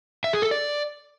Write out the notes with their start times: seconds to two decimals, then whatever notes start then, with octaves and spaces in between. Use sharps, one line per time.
0.24 E5
0.33 G#4
0.42 A4
0.51 D5